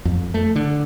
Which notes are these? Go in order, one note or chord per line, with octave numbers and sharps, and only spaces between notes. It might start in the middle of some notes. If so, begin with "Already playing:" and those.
F2
A3
D3